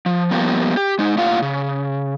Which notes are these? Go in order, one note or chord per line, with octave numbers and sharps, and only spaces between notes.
F3
F3 G3 A#3 B3
G4
G#3 D#4
A2 A#3 F4 F5 F#5
C#3